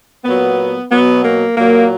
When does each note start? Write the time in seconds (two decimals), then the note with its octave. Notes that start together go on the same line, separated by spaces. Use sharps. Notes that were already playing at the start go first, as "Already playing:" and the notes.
0.25 A#2 F#3 B3
0.91 B2 F#3 B3
1.24 A#3
1.57 A#2 F#3 A#3